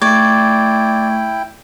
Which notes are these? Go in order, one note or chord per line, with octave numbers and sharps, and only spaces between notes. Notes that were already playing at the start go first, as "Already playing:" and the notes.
A3 E4 D5 G5 C#6 G#6